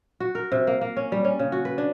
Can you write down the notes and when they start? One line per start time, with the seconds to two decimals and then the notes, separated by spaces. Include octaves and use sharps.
0.20 F#4
0.35 A#4
0.52 C3
0.67 A#3
0.81 A#3
0.97 C#4
1.12 G3
1.24 C#4
1.39 C#3
1.52 F#4
1.65 B4
1.78 D4